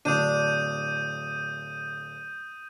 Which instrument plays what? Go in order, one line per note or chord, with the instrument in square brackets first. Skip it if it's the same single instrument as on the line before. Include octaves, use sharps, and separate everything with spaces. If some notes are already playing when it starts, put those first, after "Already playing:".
[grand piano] D1 [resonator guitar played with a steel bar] D4 [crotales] D#6 G6 D#7